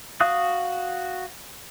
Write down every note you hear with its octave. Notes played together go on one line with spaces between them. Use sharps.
F#4 F5 D#6 F#6